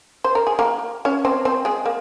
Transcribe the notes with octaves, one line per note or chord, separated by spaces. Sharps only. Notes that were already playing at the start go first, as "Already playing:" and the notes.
C5
A#4
G#4
A#3 A#4
C#4 C#5
C4 C5
C4 C5
G#3 G#4
A#3